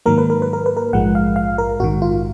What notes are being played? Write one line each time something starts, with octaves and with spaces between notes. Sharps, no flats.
G#2 D#3 F#3 A#3 A#4
B4
A#4
B4
A#4
B4
A#4
A#1 G#2 F3 G#3 F#5
F5
F5
A#4
A#1 G#2 D#3 F#4
F4